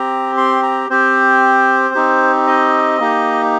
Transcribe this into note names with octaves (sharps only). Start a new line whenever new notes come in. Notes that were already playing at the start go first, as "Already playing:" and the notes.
Already playing: C4 G4 A#5
C6
A#5
C4 G4 C5
C4 D#4 G4
D#5
A#3 D#4 G4